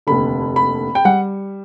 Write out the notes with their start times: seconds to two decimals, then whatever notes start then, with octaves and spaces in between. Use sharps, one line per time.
0.07 F1 D#2 D3 B5
0.56 B5
0.95 G5
1.05 G3 F#5